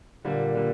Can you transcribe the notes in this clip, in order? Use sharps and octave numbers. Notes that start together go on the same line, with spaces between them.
A#2 D3 G3 A#3
D3 G3